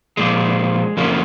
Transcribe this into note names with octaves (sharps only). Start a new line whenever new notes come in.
A#2 F3 G#3
F2 C#3 F3 A#3